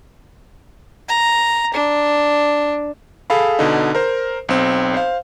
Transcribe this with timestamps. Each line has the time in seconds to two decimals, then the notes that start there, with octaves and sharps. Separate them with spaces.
1.09 A#5
1.74 D4
3.30 G#4 A4 F5 B5
3.59 B2 D3 D#4
3.95 A#4 C5
4.49 B1 C4
4.94 C5 F5